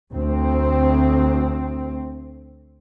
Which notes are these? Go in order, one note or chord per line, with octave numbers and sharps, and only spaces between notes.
D2 C4